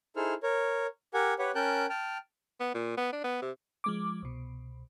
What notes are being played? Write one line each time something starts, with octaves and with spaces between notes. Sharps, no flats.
D#4 E4 G#4 A4 C5 F6
A#4 C#5
G4 A#4 F#5 G#5
G4 B4 C#5 F#5
C#4 A#4 G5 A5 F#6 G6
G5 A5 F6
B3
A#2
B3
D4
B3
C3
F3 G#3 D6
C2 B2